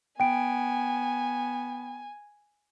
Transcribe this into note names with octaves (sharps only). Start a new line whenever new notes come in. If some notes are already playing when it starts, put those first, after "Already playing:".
B3 G5 G#5 D7